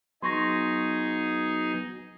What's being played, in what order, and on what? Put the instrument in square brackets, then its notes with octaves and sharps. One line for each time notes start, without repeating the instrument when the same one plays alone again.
[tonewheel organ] F#3 B3 [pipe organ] D#4 G#4 [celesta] C6 C#6 A#6